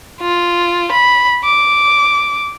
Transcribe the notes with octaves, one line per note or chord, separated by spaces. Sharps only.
F4
B5
D6